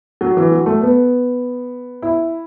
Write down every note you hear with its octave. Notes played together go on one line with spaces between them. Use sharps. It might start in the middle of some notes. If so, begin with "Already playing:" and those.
F#3
E3
F#3
A3
B3
E4